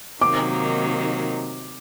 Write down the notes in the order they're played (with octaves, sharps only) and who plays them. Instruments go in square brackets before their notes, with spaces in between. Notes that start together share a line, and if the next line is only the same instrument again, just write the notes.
[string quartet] C3 D#3 F#3 A#3 D#4 [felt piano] D6